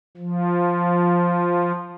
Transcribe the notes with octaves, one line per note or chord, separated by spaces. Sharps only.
F3